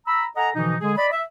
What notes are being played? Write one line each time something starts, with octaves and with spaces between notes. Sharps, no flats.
A#5 B5 E6
A4 D#5 F#5 G#5 A#5
B2 D3 E3 F3 D#4
D3 G#3 G#4
D5 D#5 B5
E5